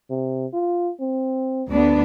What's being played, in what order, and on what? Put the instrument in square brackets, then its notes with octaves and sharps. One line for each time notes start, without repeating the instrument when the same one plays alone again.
[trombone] C3
F4
C4
[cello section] D2 B3 D4